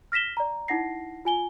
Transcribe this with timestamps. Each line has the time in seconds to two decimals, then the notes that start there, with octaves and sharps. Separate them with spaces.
0.12 F6 A#6 B6 E7 G7
0.37 D5 A#5
0.68 D#4 E4 F#5 A#6 C7
1.25 F4 G#5 G7